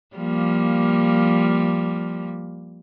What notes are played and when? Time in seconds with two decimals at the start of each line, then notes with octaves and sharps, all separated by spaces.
0.16 F3 G3 A#3